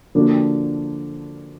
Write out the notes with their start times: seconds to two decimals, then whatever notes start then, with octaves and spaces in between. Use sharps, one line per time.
0.15 D3 F3 A#3 D4 F#4